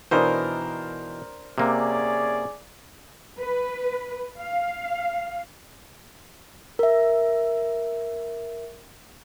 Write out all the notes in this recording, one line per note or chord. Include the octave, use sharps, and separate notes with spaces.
B2 E3 D4 D#4 A#4 C5
C3 A#3 C#4 G#4 D5
B4
F5
A#4 E5